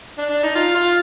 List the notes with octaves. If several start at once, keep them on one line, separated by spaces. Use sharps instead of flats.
D4
D4
D#4
F4
F4